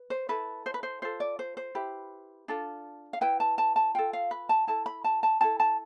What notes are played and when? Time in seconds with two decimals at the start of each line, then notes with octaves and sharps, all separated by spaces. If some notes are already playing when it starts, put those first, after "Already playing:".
Already playing: B4
0.10 C5
0.29 E4 A4 B4
0.66 C5
0.74 B4
0.83 C5
1.02 F4 A4 C5
1.20 D5
1.39 C5
1.57 C5
1.75 E4 G4 B4
2.48 D4 F4 A4
3.13 F5
3.21 E4 B4 G5
3.40 A5
3.58 A5
3.76 A5
3.95 F4 A4 G5
4.13 F5
4.31 B4
4.49 A5
4.67 E4 A4 A5
4.86 B5
5.04 A5
5.23 A5
5.41 E4 A4 A5
5.60 A5